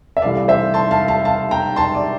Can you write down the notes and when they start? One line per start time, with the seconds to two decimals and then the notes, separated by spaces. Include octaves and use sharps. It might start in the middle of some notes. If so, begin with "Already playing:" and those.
0.17 E5
0.22 C2 C3 E3 A3 D5 F5
0.48 C5 E5
0.74 A5 C6
0.91 F5 A5
1.08 F5 A5
1.25 F5 A5
1.51 G5 A#5
1.76 A5 C6
1.95 D5